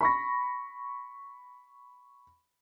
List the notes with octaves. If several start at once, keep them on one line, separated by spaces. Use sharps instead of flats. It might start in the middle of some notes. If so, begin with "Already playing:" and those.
B5 C#6 A#6